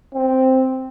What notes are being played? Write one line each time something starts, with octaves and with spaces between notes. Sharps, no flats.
C4